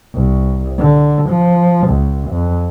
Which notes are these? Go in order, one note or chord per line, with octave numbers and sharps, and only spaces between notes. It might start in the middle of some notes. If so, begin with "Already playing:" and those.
C2
D3
F3
C#2
F2